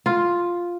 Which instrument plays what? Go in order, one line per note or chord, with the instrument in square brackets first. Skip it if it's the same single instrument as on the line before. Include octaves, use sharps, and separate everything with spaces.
[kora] F4